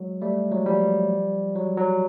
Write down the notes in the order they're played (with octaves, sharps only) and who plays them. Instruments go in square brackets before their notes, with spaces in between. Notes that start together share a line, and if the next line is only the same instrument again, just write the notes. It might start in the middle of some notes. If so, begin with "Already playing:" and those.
Already playing: [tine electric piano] F#3 G#3
G3 A3
F#3 G#3
F3 G3
F#3
F#3